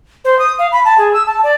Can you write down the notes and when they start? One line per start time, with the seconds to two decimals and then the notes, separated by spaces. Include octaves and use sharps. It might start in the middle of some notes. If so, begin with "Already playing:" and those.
0.25 C5
0.39 D#6
0.59 F5
0.72 B5
0.85 A5
0.98 G#4
1.13 E6
1.27 A5
1.43 D5